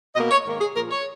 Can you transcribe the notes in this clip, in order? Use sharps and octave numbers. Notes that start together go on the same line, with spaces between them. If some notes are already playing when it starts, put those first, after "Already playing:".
B2 A#3 D#5
C#5
G#2 D#3 A#3
G#4
A#2 F3 A#3 A#4
C#5